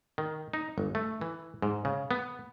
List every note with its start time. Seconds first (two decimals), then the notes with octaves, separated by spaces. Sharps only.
0.18 D#3
0.53 D#4
0.78 G1
0.95 A3
1.21 E3
1.62 G#2
1.85 C#3
2.11 B3